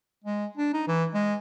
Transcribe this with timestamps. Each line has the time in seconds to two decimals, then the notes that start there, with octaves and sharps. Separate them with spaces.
0.24 G#3
0.57 D4
0.74 D#4
0.88 E3
1.14 G#3